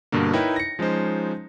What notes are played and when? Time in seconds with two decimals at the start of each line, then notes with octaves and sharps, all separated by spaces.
0.12 G2 B2 D3 A#3
0.33 D#4 E4 A#4 B4 C#5 G5
0.56 A#6 C#7
0.79 F3 G#3 C#4 D#4 C5